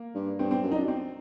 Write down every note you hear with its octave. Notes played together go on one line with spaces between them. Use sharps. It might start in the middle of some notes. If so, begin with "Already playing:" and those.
Already playing: A#3
G2
G2 C4
C4
F#2
D#4
D4
C4